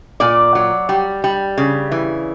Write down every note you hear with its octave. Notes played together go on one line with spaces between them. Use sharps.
A#2 D5
F#3
G3
G3
C#3
E3